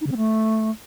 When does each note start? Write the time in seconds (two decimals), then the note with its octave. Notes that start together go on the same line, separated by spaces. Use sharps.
0.01 D#4
0.06 C#3
0.12 C4
0.17 A3